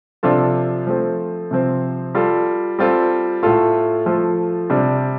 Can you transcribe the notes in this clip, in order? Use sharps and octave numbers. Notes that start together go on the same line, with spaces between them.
C3 F3 D4 F4 A4
F3 A3 C4
C3 F3 C4
G3 F4 A4
G3 C4 F4 A4
A2 A3 F4 A4
F3 A3 F4 A4
C3 G3 D4